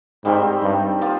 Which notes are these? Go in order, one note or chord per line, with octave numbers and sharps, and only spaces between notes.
G#2 D#3 G3 C4 G4
G2
F3 A#3 F4